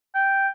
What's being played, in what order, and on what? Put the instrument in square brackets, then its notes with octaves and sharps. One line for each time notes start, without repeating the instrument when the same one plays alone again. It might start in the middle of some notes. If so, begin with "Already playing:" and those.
[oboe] G5